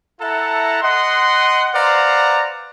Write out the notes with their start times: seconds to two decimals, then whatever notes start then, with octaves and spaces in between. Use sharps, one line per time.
0.21 E4 A4 E5 F#5 A5 A#5
0.82 D#5 F#5 C6
1.74 B4 C5 D5 F5 F#5 A#5